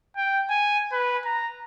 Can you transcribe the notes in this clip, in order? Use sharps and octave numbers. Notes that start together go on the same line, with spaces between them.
G5
G#5
B4
A#5